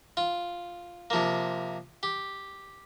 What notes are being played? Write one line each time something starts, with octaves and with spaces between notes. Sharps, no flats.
F4
C3 F3 A#3
G4